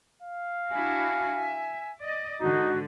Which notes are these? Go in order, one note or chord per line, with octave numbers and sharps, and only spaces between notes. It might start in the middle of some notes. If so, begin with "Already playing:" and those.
F5
D4 E4 F#4 G#5
E5
D5 D#5
G#2 D3 D#4 F#4